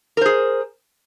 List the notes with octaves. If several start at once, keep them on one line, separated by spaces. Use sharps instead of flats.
G#4 A#4 C5